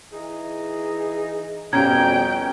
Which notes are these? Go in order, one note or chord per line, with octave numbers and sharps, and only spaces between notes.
E3 D#4 G#4
F2 B2 G3 C#4 G5 A#5 G#6